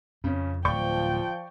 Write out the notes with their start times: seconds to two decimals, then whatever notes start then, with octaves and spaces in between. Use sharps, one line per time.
0.24 F2 C#3 C#4
0.65 D1 F3 D5 G5 C#6 G6